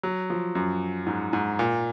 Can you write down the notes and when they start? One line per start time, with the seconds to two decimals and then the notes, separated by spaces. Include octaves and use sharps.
0.03 F#3
0.30 F3
0.55 F#2
1.07 G#2
1.33 G#2
1.59 A#2